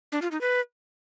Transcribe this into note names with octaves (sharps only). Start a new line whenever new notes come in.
D4
F4
D#4
B4